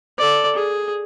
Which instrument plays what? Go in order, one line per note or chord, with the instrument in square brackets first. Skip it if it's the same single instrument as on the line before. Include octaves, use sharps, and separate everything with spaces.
[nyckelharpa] A4 D5
G#4